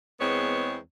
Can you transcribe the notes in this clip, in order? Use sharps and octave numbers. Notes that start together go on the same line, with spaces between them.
E2 G#3 B3 C4 C#5